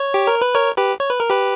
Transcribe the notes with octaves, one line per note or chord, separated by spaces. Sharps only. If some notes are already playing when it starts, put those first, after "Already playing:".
Already playing: C#5
G4
A#4
B4
A#4 C#5
G4 B4
C#5
B4
A#4
G4 B4